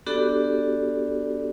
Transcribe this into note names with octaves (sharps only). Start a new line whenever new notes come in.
B3 D4 F#4 G4 A4 D5